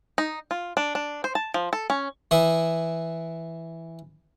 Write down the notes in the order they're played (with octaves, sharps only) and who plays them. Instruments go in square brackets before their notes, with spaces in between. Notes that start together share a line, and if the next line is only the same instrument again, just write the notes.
[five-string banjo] D#4
F4
D4
D4
C5
A5
F3
A4
C#4
[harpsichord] E3 E4 D#6